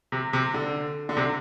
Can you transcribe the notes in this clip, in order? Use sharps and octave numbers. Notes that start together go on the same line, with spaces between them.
C3
C3
D3
D3
C3